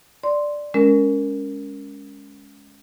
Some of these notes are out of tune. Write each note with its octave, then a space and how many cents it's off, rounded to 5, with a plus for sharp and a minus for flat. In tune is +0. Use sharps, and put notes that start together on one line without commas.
D5 +0 C6 +0
G#3 +0 C#4 +15 A#4 -5